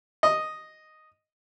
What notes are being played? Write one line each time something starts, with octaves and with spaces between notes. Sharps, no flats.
D#5